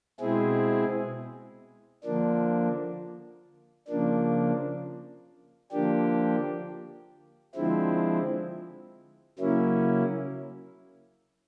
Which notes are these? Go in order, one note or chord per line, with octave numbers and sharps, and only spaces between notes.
B2 G#3 C4 E4 G#4
D3 F3 A#3 D4
C#3 F3 A#3 D4
D3 F3 A#3 D4 G4
D3 F3 G#3 C4 E4
C#3 F#3 A#3 C#4 E4